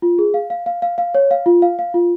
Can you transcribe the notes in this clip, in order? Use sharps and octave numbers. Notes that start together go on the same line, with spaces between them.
F4
G#4
F5
F5
F5
F5
F5
C#5
F5
F4
F5
F5
F4